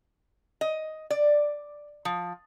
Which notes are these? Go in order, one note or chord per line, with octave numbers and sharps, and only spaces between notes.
D#5
D5
F3